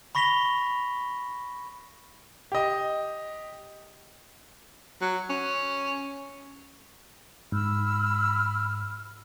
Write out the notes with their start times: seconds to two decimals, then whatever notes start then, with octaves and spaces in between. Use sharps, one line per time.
0.15 B5 C#6 A#6 B6 F7 G7
2.52 G4 D#5
5.01 F#3
5.30 C#4
7.52 G#2 B5 E6 F6